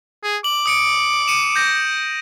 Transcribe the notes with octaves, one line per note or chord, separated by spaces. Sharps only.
G#4
D6 F#7
D#6 C#7 D7
C#7 D#7 E7
G6 A#6